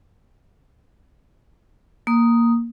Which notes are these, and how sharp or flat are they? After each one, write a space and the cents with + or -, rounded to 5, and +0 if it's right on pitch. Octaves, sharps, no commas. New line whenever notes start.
A#3 +0 D#6 +0